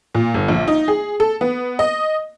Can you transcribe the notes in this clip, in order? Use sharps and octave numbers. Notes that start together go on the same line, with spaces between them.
A#2
G1
A#1
D#4
G#4
A4
B3
D#5